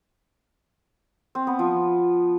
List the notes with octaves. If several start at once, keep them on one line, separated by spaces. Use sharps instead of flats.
C4
B3
F3